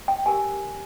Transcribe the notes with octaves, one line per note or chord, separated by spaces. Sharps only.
G5
G4 A#4 G#5